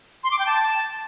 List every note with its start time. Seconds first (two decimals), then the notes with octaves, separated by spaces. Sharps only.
0.24 C6
0.31 D6
0.39 G5
0.46 A5